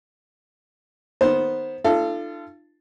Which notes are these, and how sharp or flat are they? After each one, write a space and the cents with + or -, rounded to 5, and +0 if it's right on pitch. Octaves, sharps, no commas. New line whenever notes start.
D#3 +0 B3 +0 C5 +10
D4 +40 F4 -35 A4 +0